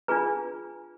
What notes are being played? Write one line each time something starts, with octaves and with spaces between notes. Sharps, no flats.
D4 F4 G#4 B4 A#5